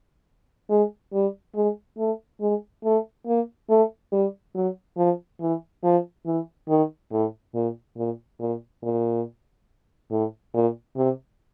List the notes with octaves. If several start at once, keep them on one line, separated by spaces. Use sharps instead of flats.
G#3
G3
G#3
A3
G#3
A3
A#3
A3
G3
F#3
F3
E3
F3
E3
D#3
A2
A#2
A#2
A#2
A#2
A2
A#2
C3